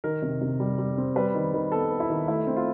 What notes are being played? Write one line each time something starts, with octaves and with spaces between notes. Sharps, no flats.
D#3 A#4
C3
C3
G3
G3
C4
G3 B4
D#3
D#3
B3 A4
B3
E4
D#3
A3 E4
C4
F4